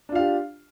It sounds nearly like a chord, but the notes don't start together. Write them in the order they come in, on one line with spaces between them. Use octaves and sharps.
D4 F4 F5 G4